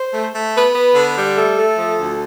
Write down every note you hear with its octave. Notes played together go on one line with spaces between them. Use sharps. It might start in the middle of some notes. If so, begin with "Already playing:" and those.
Already playing: C5
A3
A3
B3 B4
B3
D3
G3
A3 A4
A3
F3
D2